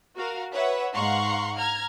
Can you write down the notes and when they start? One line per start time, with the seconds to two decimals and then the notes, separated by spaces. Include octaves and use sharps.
0.16 F#4 A#4 F5
0.53 B4 C#5 E5 F#5
0.93 G#2 F5 F#5 A#5 C6 C#6
1.56 A#5 F6 G#6